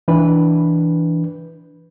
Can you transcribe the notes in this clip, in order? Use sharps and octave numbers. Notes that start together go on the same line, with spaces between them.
E3 D4 B4